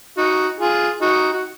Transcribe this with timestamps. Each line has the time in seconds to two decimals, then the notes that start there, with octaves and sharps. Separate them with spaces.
0.18 D#4 F#4
0.60 F4 G#4
1.02 D#4 F#4
1.33 F#4